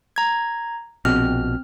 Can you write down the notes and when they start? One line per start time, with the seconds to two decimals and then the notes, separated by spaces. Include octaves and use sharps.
0.16 A#5 G#6
1.05 A#1 B2 C4 F6